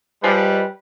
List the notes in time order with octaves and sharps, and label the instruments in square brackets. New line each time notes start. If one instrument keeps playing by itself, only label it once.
[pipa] F3 G#3 [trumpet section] G3 B4